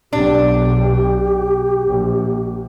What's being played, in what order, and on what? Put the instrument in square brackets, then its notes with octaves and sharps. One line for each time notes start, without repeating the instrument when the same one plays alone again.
[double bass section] B1 [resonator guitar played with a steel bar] D4 [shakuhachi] G4
[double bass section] A#1